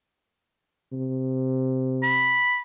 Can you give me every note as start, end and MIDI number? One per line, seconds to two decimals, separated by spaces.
0.93 2.46 48
2.03 2.61 83